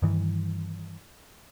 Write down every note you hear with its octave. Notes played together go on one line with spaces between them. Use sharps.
G2 D#3 E3